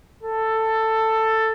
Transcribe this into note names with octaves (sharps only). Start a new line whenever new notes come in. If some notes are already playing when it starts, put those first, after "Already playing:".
A4